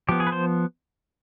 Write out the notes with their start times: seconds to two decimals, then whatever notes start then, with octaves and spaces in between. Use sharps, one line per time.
0.09 F3 B3 G4
0.20 G#4
0.27 B4
0.32 C5